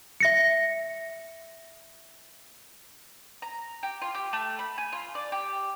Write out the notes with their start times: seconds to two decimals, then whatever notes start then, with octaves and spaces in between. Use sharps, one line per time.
0.20 E5 A#6 C#7
3.42 A#5
3.83 G4
4.02 F4
4.14 G4
4.33 A3
4.59 B5
4.78 G#5
4.92 F4
5.15 D5
5.32 G4